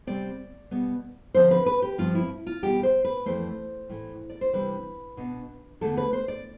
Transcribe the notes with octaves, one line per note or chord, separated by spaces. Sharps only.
C3 G3 C4 D5
B2 G3 B3
D3 F3 C4 C5
B4
B4
G4
G2 F3 C4 F4
E4
F4
E2 B2 G3 G4
C5
B4
F2 E3 A3 C5
A2 E3 A3
D5
C5
C3 E3 G3 D4 B4
B2 B3 D4
E2 D3 A3 A4
B4
C5
D5